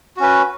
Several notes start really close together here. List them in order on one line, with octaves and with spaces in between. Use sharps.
F#4 C#4 B4